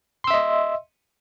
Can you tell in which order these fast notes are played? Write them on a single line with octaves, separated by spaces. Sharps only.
C6 E6 E5 D#5